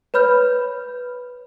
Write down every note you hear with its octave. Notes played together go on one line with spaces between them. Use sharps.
B4 C#5 B5 F6 G6